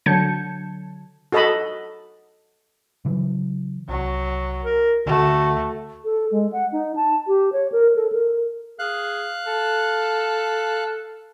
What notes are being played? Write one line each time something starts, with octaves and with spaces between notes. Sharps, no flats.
D3 F#3 A5 G6 G#6 C#7
F#4 A4 D#5 A5 B5
C#3 E3 F#3
C2 F#3
A#4
D2 D3 A3 F#4
A4
G#3
F#5
D#4
A5
G4
C#5
A#4
A4
A#4
G#4 F5 F#6
A4